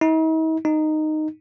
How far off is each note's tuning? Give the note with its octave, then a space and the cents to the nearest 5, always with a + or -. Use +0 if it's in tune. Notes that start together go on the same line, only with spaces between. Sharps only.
D#4 +45
D#4 -10